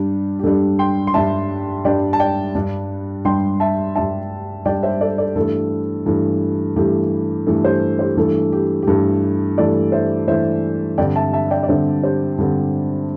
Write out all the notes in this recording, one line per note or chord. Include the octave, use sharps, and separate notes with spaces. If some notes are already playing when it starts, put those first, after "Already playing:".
Already playing: G2 G3 D4 G4
G4
G2 G3 D4 A4
G5 C6
C6
G2 G3 D4 E5 A5
G2 G3 D4 D5 G5
A5
D5 G5
G2 G3 D4
G2 G3 D4 G5 C6
E5 A5
G2 G3 D4 E5 A5
G2 G3 D4 D5 G5
C5 E5
A4 D5
A4 D5
G2 E3 A3 A4
G2 E3 A3
G2 E3 A3 G4
G2 E3 A3 A4
G4 C5
G4 C5
G2 E3 A3 A4
G4
G4
G2 E3 A3 A4
G2 E3 A3 A4 D5
C5 E5
G2 E3 A3 C5 E5
G2 D3 C4 D5 G5
E5 A5
E5 A5
E5
D5 G5
D5
G2 D3 C4 C5 E5
G4 C5
G2 D3 C4